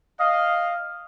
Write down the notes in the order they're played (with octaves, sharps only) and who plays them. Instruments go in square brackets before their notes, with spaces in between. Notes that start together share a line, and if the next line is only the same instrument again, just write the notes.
[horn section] D#5 F5